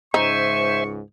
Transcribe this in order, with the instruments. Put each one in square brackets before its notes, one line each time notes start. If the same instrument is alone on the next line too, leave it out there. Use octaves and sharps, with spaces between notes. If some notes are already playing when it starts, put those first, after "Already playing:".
[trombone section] C#2 G#2 [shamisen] D#4 [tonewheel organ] C5 E5 G#5 [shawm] C#6